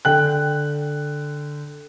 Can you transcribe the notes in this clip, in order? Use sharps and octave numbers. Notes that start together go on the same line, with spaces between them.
D3 G5 F#6